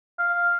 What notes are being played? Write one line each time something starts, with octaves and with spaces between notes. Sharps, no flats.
F5